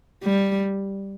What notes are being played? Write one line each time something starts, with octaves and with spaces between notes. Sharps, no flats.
G3